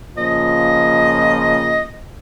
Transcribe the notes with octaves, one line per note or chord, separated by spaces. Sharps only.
A#2 C#3 F3 D#5